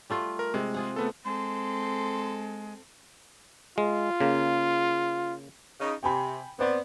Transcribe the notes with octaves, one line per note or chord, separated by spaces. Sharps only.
G3 A3 F4
A#4
C3 G#3
F4 G#4 F#5
A3 B3 A4
G#3 C4 A4 C6
G#3 F4
C#3 A#3
C#3 D#4
C3 G5 G#5 B5
B3 C4 C5 D5